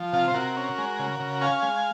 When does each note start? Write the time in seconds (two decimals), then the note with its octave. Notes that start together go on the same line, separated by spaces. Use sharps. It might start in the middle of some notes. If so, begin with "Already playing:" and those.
Already playing: F3
0.13 C3 F4
0.28 C5
0.34 C3 F#4 A#4
0.57 C#4
0.78 G#3
0.99 C#3
1.20 C#3
1.41 C#4 F5 G#5
1.63 G#3